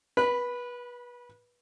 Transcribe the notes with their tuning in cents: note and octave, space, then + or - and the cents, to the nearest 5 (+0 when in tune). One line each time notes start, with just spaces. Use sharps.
B4 -25 B5 +0